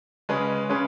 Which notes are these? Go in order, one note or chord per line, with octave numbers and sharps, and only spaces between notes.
C#3 G#3 C#4 G#4 B4
C#3 G#3 C#4 G#4 B4